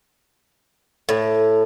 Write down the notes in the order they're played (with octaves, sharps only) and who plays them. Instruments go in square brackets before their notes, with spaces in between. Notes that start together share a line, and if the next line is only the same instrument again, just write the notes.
[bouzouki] A2